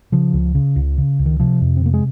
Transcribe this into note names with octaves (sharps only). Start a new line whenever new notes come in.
C#3 F3
C#2
C#3
C#2
C#3
C#2
D#3
C3 F3
F2
C4
C3 A#3
G#3